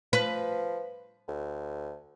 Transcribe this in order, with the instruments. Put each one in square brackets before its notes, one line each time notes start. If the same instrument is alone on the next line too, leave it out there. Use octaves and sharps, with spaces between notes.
[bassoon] F3 [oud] B4
[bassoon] D2